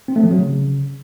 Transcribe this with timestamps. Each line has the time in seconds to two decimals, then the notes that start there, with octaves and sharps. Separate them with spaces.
0.08 C4
0.16 A3
0.23 F3
0.31 F#3
0.39 C#3